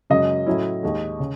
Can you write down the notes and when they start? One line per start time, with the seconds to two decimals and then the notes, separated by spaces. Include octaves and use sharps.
0.10 F#2 C#3 G#3 D#5
0.47 A2 F#3 C#4 E4
0.83 D#2 D#3 G#3
1.20 C#3